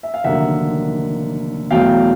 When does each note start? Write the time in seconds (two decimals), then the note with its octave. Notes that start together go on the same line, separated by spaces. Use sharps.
0.03 E5
0.14 F5
0.24 F1 D#2 D3 F#3 A#3 E5 F#5
1.71 E2 B2 F#3 A3 F5 G5